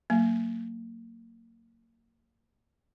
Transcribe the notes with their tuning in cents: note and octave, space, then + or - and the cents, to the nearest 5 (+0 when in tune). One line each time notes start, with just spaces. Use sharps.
F#3 +0 A#3 -25